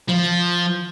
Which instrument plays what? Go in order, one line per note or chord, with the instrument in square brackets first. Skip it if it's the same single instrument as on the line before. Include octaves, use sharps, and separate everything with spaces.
[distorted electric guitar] F3